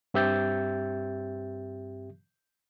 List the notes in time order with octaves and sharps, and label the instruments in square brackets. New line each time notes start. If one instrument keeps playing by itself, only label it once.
[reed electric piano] G2 C4 G4 E5 G6 A6